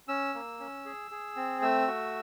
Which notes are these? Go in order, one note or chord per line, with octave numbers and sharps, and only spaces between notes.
C#4 E6
A#3
C#4
G#4
G#4
C4
A3 E6
F#4